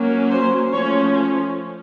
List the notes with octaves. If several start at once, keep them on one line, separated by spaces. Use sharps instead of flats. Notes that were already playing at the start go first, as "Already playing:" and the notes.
Already playing: F#3 A#3 C#4
C5
F3 A3 C#4 C#5